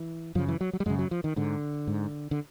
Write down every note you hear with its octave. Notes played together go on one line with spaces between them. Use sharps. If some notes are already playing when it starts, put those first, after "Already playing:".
Already playing: E3
F#2 C#3 F3
E3
F#3
F#3
G3
F#2 C#3 G#3
F#3
F3
D#3
G#2 D3
G#2
D3